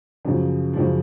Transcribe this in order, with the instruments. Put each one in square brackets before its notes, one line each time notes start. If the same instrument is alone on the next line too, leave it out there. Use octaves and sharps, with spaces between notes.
[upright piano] F#2 C#3 F3
F#2 C#3 F3